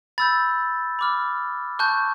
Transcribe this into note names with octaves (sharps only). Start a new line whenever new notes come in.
B5 E6 G6 A6
B5 D6 F6
A5 C#6 F#6 G6